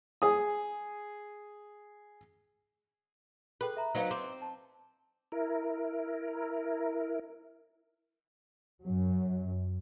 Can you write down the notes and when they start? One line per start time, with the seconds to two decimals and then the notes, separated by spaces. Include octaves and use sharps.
0.22 G#4 D#6
3.61 G#4 A4 B4 G5
3.77 E5 A#5
3.95 F#3 B3 D#4 C5 F5 A#5
4.11 C4 D6
4.42 A5
5.32 E4 A#4
8.82 F#2 F#3